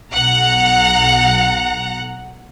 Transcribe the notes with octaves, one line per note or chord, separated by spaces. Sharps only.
B1 F#5 A#5